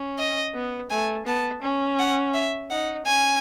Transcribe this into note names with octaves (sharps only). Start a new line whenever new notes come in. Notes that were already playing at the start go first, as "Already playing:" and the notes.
Already playing: C#4
D#5
B3
A3 G#5
B3 A5
C#4
F#5
E5
D#4 F#5
C#4 G#5